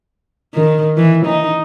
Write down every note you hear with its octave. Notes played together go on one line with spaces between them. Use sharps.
D#3
E3
D#4